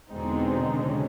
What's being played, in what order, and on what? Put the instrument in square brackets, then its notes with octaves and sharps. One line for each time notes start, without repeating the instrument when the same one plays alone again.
[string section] E2 B2 G#3 C4 D#4 [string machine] D3 D4
[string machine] D3 D4
C#3 C#4